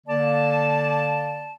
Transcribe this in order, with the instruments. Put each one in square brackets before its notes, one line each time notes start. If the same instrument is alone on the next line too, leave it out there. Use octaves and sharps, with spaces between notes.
[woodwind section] D3 A#3 D5 A5